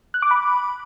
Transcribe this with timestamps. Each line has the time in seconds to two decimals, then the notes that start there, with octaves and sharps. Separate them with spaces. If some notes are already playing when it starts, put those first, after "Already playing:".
0.14 F#6
0.22 D6
0.31 B5